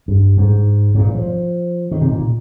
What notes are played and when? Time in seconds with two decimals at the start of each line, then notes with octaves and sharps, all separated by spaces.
0.08 G2
0.38 G#2
0.95 G#2
0.99 A#2
1.15 F3
1.91 D#3
2.01 C3
2.12 A#2